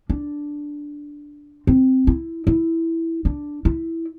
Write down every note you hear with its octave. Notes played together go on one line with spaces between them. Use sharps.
D4
C4
E4
E4
D4
E4